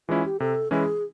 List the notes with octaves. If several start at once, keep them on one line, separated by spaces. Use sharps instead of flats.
E3 G#3 C#4 E4 F4
G4
C3 A4
E3 G#3 C#4 E4 G#4